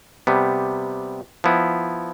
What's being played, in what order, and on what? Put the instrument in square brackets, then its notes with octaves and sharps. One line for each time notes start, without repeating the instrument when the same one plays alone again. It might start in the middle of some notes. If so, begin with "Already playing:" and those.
[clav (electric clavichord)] C3 G3 B3
F3 B3 E4